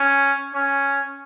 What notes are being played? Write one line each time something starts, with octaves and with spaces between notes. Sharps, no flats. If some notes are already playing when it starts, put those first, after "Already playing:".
Already playing: C#4
C#4